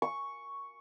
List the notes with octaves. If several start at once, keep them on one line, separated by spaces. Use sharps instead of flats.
C#6